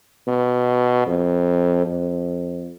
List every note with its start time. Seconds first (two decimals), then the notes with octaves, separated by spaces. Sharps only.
0.27 B2
1.06 F2
1.86 F2